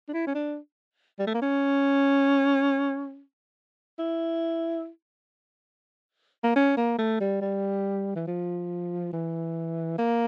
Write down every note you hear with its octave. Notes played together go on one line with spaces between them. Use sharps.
D4
E4
C#4
D4
G3
A3
A#3
C#4
E4
A#3
C#4
A#3
A3
G3
G3
E3
F3
E3
A#3